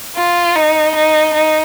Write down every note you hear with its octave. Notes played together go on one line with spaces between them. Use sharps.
F4
D#4
D#4
D#4